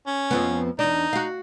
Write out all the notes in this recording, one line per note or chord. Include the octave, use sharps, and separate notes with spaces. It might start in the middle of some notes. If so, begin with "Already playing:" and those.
C#4
F2 F3 B3
E2 D4 D#4
F#4 F5